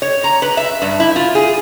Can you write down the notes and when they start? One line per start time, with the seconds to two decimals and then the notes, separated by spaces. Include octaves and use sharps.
0.02 C#5
0.24 A#5
0.42 B4
0.57 E5
0.82 G2
1.00 E4
1.16 F4
1.35 G#4